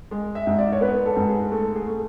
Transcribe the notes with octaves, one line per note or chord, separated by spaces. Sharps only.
G#3
E5
G#2
D5
C#5
B3 B4
A4
G#2
G#4
A3 A4
G#4
A3